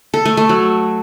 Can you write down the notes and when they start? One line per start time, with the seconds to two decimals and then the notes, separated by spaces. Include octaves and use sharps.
0.14 A4
0.25 A3
0.37 A3
0.49 F#3